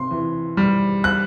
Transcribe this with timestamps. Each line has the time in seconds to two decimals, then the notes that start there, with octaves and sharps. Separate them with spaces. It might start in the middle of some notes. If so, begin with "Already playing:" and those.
Already playing: C3 C6
0.11 E3
0.57 G3
1.04 F#6